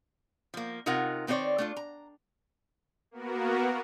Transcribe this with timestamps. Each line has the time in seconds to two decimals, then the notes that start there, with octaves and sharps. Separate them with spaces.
0.54 F3 A#3
0.86 C3 D#4 F4 A#4 F#5
1.27 D#3 B3 C4 F#4 C#5 D5
1.58 A3 D4 F4
1.77 A#5
3.11 A#3 B3 F#4 A#4